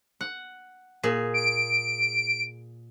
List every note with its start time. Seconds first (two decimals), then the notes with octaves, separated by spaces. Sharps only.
0.21 F#5
1.03 A#2 G#4
1.34 D7